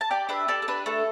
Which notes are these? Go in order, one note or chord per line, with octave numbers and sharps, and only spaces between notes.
A5
G4 D5 G5
D4 B4 E5
G4 A4 D5
A4
D4 B4
A3 A4